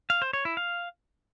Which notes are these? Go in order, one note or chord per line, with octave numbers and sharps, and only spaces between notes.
F5
C5
C#5
E4
F5